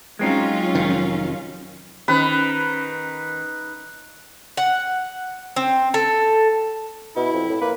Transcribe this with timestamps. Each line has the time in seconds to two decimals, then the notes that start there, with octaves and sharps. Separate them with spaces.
0.19 F#3 G#3 C4 C#4 D#4 F4
0.75 F1 D#3
2.08 D#3 C#4 B4 C5 B5
4.57 F#5
5.56 C4
5.94 A4
7.16 B2 E4
7.33 F2
7.49 A2
7.61 A#3 B4